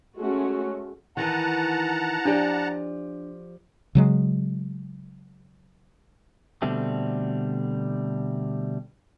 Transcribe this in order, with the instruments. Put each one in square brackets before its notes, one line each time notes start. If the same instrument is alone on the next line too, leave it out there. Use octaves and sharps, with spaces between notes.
[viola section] G#3 A3 C#4 F#4
[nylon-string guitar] D#3 E3 [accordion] F#5 A5 A#5
[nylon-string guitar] F3 G4 D5 [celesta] D4
[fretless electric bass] C#3 F#3 G#3
[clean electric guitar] B2 D3 G3 A3 C4